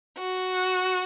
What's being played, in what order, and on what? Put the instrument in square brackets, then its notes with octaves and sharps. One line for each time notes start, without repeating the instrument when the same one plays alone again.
[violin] F#4